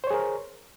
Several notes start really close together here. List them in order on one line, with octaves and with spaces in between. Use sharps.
C5 C#5 G#4 A#4